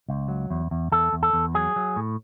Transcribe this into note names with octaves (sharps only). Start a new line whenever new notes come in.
C#2
F#3
E2
E2
E2 A4
E2
A4
E2
F#3 G#4
F#3
A2